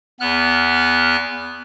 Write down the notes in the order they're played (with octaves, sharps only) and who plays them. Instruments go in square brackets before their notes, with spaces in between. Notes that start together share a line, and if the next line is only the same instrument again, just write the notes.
[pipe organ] E2 B3 F6 F#6